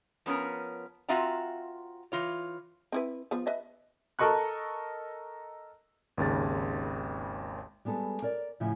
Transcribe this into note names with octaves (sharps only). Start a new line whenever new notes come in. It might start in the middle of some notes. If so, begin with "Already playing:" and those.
F3 B3 C#4 A#4
C4 F4 F#4 E5 F5 A#5
E3 F4 C#5
C4 E4 B4
F3 B3
B4 D#5 E5
A4 A#4 D#5 C#6 F#6
G#1 D#2 C#3 A6
G3 G#3 B3 A4
A#4 C#5 D5
A2 C#3 F3 E4 E5